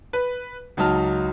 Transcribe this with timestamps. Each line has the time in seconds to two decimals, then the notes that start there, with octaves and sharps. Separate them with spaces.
0.13 B4
0.77 C#2 F#3 D#4 A5 F6